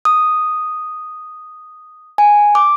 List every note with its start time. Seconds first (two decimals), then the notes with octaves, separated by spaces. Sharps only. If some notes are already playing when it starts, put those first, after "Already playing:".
0.05 D#6
2.18 G#5
2.55 D6